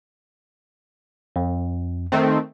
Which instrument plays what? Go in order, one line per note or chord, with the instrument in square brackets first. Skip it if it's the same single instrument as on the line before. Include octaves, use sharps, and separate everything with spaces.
[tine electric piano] F2
[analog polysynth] D#3 A3 C4